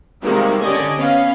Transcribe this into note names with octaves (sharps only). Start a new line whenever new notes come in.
C3 D#3 G3 G#3 A#3
D3 C#4 G4 D5 D#5 G#5
B3 C#4 F5